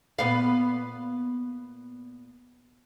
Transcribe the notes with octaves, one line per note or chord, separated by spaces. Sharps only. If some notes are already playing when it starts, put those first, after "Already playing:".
A#2 B3 F5